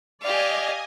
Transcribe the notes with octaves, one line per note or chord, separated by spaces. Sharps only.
G4 D5 D#5 F5 G#5